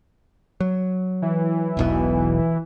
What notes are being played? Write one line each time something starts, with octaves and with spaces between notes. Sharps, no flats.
F#3
E3
E1 B1 B2